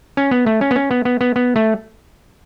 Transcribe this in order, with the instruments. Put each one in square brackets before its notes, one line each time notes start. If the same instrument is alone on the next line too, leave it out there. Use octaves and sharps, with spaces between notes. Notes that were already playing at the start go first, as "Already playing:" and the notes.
[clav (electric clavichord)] C#4
B3
A3
C#4
B3
C#4
B3
B3
B3
B3
A3